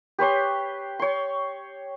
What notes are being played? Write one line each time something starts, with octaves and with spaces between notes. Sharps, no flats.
G4 B4 C#5 C6
C#5 C6